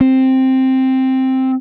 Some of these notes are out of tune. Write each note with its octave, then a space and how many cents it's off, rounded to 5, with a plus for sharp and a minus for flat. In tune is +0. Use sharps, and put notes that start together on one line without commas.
C4 +5